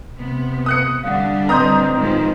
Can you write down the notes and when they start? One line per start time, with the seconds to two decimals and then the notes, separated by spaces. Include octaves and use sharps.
0.17 C3 B3
0.66 D#6 F#6 C#7
1.04 D3 G3 D4 F5 F#5
1.49 A2 C4 B4 D#5 A#5 C6 D#6 G6
1.95 D#3 F3 G#3